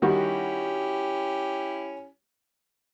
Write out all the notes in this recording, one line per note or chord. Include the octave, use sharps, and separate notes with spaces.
D#3 G3 C#4 E4 F#4 G4